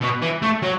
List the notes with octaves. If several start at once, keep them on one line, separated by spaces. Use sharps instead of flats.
B2
E3
A3
F#3